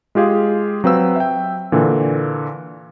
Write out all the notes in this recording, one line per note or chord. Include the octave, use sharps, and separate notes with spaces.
G#3 F4 G4 G#4 F5
F#3 C4 B4 F5 E6
E5 G5
A#2 D3 E3